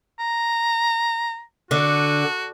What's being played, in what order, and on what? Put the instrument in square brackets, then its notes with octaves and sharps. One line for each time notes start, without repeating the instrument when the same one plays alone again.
[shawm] A#5
[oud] D3 [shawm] F#4